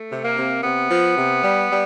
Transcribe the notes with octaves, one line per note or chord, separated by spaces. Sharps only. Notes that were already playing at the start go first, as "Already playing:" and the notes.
Already playing: A3
C3
A#3
C3
C3 B3
F3
C3
G3
G3